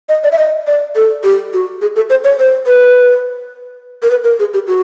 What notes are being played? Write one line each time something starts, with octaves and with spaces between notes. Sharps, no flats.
D#5
D5
E5
D#5
D5
A4
G4
F#4
G#4
A4
C5
C#5
C5
B4
A#4
B4
A#4
G#4
G4
F#4